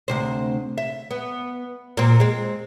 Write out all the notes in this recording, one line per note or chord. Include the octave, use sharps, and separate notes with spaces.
D2 C3 C5
E5
B3
A#2 C4
G#3 C4